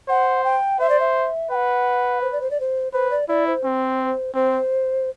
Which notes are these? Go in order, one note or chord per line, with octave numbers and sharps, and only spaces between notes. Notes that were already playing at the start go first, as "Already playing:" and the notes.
C5 F#5
G5
C5 E5
D5
E5
B4 F#5 G5
C5
D5
C5
D5
C5
B4 C5
D5
E4 D5
C5
C4
C4 C5